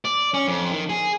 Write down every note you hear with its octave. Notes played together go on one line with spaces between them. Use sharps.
D5
C#4
F2
D#3
G#4